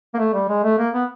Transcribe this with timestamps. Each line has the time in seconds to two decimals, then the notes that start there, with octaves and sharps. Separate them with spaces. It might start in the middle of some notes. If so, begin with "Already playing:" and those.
0.14 A#3
0.19 A3
0.34 G3
0.49 G#3
0.63 A3
0.78 A#3
0.94 B3